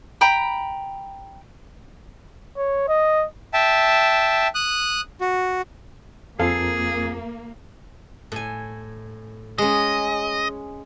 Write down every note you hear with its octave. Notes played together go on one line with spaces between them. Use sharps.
G5 A#5 B5
C#5
D#5
E5 G5 A5
D#6 F#6
F#4
F2 A#3 C4 F4 G#4 A4 F5 G#5
A2 G#5
G#3 C#4 D#5